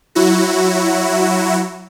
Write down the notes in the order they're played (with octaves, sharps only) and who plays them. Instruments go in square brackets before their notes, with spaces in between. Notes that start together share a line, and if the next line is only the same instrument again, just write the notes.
[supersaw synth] F#3 E4 F#4